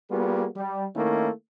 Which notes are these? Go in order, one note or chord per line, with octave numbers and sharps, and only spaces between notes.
G3 A#3 B3 F4 F#4 G#4
G3
D#3 A3 A#3 C#4 E4